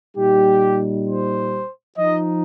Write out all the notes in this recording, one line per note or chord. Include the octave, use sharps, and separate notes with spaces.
A#2 G3 D#4 G4
C5
F3 D#4 D#5